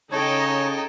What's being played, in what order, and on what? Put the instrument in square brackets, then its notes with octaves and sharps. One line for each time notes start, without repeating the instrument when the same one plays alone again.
[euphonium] C#3 [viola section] D#4 [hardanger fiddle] A4 G5 [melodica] C#5